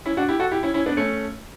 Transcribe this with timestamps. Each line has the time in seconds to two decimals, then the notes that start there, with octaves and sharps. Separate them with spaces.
0.06 C#4 E4
0.17 D4 F#4
0.28 E4 G4
0.40 F#4 A4
0.52 E4 G4
0.63 C#4 E4
0.74 C#4 E4
0.86 B3 D4
0.97 A3 C#4